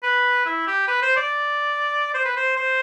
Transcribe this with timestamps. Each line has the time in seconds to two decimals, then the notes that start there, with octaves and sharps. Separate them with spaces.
0.03 B4
0.46 E4
0.67 G4
0.88 B4
1.02 C5
1.16 D5
2.14 C5
2.25 B4
2.36 C5
2.57 C5